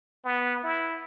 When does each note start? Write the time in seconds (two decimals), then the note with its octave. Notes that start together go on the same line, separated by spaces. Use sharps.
0.25 B3
0.63 E4